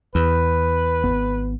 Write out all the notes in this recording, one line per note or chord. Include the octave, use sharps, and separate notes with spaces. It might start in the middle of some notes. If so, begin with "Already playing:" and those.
E2 B4
G#1 B3